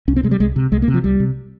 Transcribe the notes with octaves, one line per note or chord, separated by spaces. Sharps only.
C2 C#4
C4
C3 G#3
G3
C2 G#3
C3
C2 G#3
A#3
C3
F3
C2 G3
C3